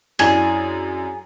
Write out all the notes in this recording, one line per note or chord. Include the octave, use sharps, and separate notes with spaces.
F#2 D4 E4 G#4